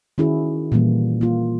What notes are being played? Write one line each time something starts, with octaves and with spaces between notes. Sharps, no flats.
D#3 C#4 E4 F#4 G#4
A#2 E3 G3 A#3
A#3 F4